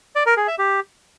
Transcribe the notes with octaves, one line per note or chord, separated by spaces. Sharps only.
D5
A#4
G#4
E5
G4